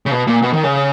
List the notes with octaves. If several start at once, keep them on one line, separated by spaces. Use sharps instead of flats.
C#3
B2
A#2
B2
D#3
C#3